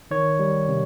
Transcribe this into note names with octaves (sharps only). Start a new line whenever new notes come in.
D#3 C#5
G3
C3